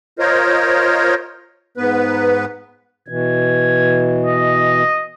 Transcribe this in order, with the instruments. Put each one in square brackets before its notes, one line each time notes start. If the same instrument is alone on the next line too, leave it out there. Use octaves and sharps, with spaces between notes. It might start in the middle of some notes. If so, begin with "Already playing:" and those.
[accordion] F4 A#4 C5 C#5 D#5
G#2 B3 B4
[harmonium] B2 E3 [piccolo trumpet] G#6
[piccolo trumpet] D#5